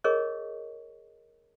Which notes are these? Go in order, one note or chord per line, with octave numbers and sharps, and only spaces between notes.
G#4 A#4 C#5 D#5 C#6